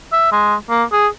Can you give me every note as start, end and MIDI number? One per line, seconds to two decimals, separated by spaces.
0.13 0.29 76
0.32 0.55 56
0.70 0.84 58
0.92 1.07 68